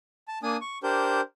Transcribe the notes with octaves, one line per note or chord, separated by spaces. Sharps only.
A5
A#3 D4 G#5 D#6
C#6
D4 G4 A#4 C5 G6